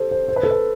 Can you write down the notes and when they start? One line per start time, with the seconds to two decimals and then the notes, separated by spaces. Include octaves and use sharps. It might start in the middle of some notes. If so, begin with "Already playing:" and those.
Already playing: G4 A4 C5
0.11 C5
0.28 C5
0.36 B4
0.43 A4
0.51 B4